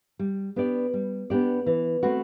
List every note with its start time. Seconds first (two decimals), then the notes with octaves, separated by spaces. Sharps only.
0.19 G3
0.56 B3 D4 G4 D5
0.94 G3
1.30 B3 D4 G4 D5
1.66 E3
2.03 A3 C4 F#4 B4